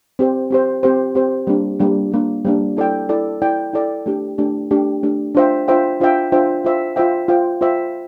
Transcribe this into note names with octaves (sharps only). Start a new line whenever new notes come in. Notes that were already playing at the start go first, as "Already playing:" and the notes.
C4 G4 C5
C4 G4 C5
C4 G4 C5
C4 G4 C5
G3 A#3 D4
G3 A#3 D4
G3 A#3 D4
G3 A#3 D4
E4 A4 D5 G5
E4 A4 D5 G5
E4 A4 D5 G5
E4 A4 D5 G5
A3 D4 G4
A3 D4 G4
A3 D4 G4
A3 D4 G4
D4 F4 C5 E5 G5
D4 F4 C5 E5 G5
D4 F4 C5 E5 G5
D4 F4 C5 E5 G5
F4 C5 E5 G5
F4 C5 E5 G5
F4 C5 E5 G5
F4 C5 E5 G5